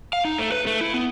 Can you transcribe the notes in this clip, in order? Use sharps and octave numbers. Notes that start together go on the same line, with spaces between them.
F5
D#4
A3
B4
A3
E4
B3